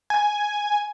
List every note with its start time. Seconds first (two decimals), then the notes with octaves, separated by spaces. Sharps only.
0.10 G#5